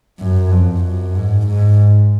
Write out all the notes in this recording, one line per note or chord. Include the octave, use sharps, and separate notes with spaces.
F#2
F2
F#2
G#2
G#2